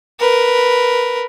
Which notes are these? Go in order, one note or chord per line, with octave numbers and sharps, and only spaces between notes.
A#4 B4